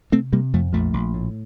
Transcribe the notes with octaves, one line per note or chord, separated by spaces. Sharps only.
C3 A3 C4
C3 G3 A#3
F2 F3 A3
A#1 F3 A3
A#1
A2